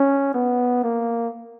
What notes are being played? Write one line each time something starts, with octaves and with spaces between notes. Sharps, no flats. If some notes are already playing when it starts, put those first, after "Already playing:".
Already playing: C#4
B3
A#3